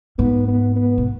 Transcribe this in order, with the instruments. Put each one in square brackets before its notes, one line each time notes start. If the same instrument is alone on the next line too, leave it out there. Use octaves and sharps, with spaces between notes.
[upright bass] G#2 [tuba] B3
[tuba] B3
B3
[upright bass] B2